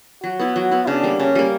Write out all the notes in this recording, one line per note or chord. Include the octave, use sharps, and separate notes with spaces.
F#3 F#4
B3 E4
F#3 F#4
B3 E4
C#3 D4
G3 A#3
C#3 C#4
G3 A#3